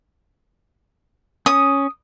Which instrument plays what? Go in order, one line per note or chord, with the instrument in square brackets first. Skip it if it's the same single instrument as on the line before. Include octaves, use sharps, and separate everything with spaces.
[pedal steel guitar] C#4 [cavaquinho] D#6